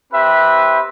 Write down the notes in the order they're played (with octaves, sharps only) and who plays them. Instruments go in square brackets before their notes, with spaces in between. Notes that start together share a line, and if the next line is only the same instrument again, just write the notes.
[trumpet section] C4 G4 B4 E5